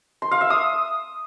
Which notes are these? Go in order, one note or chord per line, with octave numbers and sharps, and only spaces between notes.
C6
F5
E5
D#6